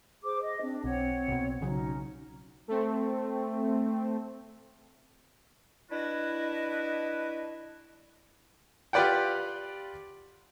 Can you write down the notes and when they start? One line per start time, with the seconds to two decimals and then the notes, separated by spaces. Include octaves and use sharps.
0.23 G#4 C5 D6
0.40 D#5
0.62 C4 D4
0.84 B1 C4 C#5 F#5
1.28 B1 B2
1.61 B1 C#3 F#3 C#4 D#4
2.68 A3 C4
5.91 D4 E4 F#4 B4 D#5
8.93 F4 G4 B4 D5 F#5 G5